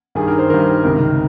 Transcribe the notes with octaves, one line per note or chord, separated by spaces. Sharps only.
G2 D#3 G#4
A#4
C5
G2 D#3 A#4
C#2 C3 D#3 A#4